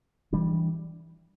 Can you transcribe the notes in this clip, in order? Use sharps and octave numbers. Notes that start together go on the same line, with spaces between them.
E3 G3 D4